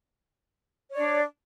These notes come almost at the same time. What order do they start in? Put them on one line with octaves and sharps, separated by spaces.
C#5 D5 D4